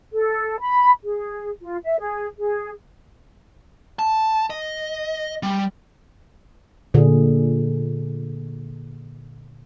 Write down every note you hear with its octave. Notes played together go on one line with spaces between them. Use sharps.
A4
B5
G#4
F4
E5
G#4
G#4
A5
D#5
G3
A#2 D3 G#4